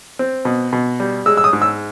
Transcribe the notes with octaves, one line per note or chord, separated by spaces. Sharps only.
C4
B2
B2
G3
G#3 E6
E6
D#6
G#2
E6